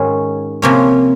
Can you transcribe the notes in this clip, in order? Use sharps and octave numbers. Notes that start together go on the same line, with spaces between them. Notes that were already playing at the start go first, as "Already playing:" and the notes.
Already playing: G#2 D#3 G#3 C#4 F#4
C3 F3 A#3 C#4